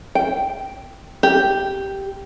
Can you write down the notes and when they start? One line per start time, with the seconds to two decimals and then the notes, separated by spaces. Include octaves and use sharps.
0.15 G5
1.23 G4